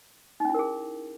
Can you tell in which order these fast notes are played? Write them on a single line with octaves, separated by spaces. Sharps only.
D#4 C#4 E4 A#4 G#4